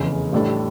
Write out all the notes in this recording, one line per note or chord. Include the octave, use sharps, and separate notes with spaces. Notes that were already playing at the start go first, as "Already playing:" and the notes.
Already playing: F1 E2 C#3
A1 A2 G3 D4 A4